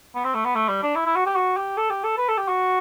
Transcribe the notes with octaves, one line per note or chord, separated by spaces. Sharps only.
B3
C4
A3
B3
A3
G3
D4
E4
E4
F#4
G4
F#4
G4
A4
G4
A4
B4
A4
G4
F#4